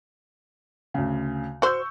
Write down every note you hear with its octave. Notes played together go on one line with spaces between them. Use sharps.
D2 C#3
F#4 C5 C#6 E6 G6